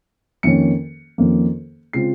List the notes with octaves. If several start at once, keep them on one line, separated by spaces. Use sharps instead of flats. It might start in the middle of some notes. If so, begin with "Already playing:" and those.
F2 D#3 A#3 C#4 C#7
F2 D#3 A#3 C#4
C#3 G#3 C4 F4 C7